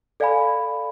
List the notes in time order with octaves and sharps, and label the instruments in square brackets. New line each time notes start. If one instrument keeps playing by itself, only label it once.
[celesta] A4 D5 F5 G#5 B5